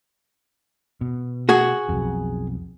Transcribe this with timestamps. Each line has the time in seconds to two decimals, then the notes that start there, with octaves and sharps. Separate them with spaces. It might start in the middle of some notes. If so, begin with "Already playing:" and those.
1.01 B2
1.49 F#4 G#4
1.89 B1 F2